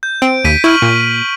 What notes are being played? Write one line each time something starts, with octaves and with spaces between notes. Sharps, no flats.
G6
C4 D7
D#2 B6 D#7
E4 C#6 F6 F#7
A#2